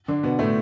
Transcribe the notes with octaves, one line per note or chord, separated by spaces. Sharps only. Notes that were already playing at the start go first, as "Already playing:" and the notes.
D3 D4
B2 B3
A2 A3